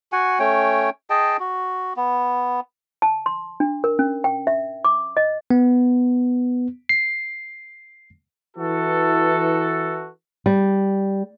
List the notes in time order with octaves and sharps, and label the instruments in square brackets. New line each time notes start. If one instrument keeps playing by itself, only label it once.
[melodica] F#4 F#5 G#5
A3 C#4 C#5 G5
G#4 D#5 G5 A5
F#4
B3
[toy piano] A5
C6
D4
A#4
C#4
G5
E5
D6
D#5
[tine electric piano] B3
C7
[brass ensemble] E3 F#4 A4
[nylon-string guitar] G3